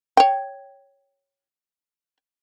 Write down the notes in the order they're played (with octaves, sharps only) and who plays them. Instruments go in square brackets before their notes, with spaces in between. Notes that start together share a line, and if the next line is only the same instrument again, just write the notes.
[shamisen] C#5 G5